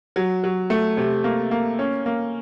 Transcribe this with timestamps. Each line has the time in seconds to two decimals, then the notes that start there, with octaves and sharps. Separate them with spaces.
0.16 F#3
0.44 F#3
0.70 A3
0.97 C3
1.24 A#3
1.51 A#3
1.79 C#4
2.06 A#3